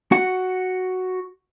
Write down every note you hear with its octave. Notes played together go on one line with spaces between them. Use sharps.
F#4 F#5